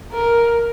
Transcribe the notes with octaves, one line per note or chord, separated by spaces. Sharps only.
A#4